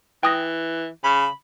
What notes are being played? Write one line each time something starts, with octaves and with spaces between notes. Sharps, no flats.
E3 G5 D#6 A#6
C#3 B5